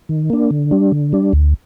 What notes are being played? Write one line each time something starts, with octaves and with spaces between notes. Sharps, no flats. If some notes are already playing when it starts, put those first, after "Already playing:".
D#3
A#3 D4
D3
G3 D4
D3
G3 D4
D2